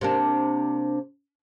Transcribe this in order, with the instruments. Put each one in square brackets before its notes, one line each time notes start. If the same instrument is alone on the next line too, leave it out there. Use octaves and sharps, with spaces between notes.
[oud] C3 A#3 D4